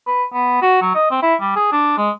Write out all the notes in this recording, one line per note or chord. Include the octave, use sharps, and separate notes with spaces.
B4
B3
F#4
F#3
D#5
C4
E4
G3
G#4
D4
G#3